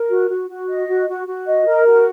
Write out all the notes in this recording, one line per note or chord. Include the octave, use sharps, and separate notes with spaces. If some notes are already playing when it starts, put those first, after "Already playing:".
Already playing: A#4
F#4
F#4
F#4
D#5
F#4
F#4
F#4
D#5
A#4
F#4